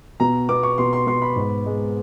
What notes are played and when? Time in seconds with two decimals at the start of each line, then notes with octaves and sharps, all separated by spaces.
0.20 B2 A#5
0.49 B3 D6
0.63 C#6
0.78 B2 C6
0.93 C6
1.07 B3 C6
1.22 B5
1.36 G#2
1.66 G#3